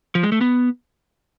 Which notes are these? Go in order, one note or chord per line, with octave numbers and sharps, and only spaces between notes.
F3
G#3
A3
B3